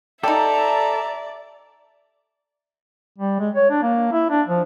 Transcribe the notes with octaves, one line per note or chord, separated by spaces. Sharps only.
D#4 G4 A4 D5 E5 A#5
G3
G#3
C#5
D4
A#3
E4
D4
F3